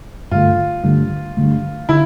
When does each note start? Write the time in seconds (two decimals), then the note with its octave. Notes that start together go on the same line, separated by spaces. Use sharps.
0.31 G2 D3 A3 F4
0.84 G2 D3 A3
1.37 G2 D3 A3
1.89 D3 E4